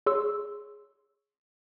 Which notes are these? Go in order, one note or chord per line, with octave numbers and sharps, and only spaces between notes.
G#4 C#5 C6 C#6 E6